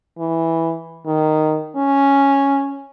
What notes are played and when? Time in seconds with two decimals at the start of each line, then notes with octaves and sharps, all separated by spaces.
0.19 E3
1.07 D#3
1.76 C#4